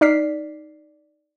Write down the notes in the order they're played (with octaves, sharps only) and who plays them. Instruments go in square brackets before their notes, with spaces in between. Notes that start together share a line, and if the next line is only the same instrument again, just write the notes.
[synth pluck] D#4 D5 F6 B6 C7